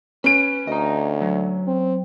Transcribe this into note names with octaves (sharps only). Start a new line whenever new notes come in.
C#4 B4 D7
D2 D#5 A#5
F#3
C4